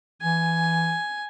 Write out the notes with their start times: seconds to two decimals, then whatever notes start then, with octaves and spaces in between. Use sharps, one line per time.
0.22 E3 G#5